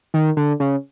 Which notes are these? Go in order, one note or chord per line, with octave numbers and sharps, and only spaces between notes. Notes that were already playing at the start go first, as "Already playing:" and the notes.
D#3
D3
C#3